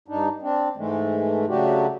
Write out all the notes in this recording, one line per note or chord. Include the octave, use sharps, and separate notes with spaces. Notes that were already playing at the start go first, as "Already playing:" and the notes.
G2 D4 D#4
C4 D4
G#2 E3 G#3 A3
C#3 F#3 A3 D4 F#4 G4